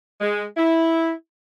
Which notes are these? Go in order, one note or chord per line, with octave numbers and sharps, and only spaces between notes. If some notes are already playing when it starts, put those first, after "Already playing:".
G#3
E4